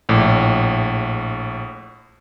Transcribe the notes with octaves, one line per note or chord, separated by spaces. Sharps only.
A#1 A2